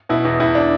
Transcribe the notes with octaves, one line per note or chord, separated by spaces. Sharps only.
B2 E4
E2
E2 E4
D4